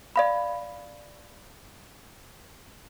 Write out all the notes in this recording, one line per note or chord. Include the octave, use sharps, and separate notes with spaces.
D5 F5 B5